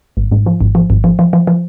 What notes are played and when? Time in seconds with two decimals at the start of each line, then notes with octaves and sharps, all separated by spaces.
0.17 G#1
0.32 G#2
0.46 F3
0.61 G#1
0.75 F3
0.90 G#1
1.04 F3
1.19 F3
1.33 F3
1.47 F3